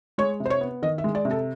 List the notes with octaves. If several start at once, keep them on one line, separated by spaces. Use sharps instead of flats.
G#3 C#5
C3
C5
C#5
B3
D#3 D#5
E5
G#3
D5
C3
A4